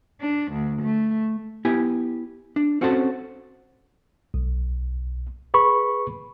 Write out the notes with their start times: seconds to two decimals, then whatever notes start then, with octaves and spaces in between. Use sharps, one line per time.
0.21 D4
0.52 D2
0.82 A3
1.65 B3 E4 G4 G#5
2.56 D4
2.81 C4 C#4 F#4 A4 C5 A5
4.34 B1
5.54 G#4 B4 B5 C#6